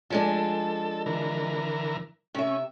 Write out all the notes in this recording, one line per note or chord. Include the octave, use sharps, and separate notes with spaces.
F3 G#3 D4 A4
D3 E3 A#4
C3 C#4 E5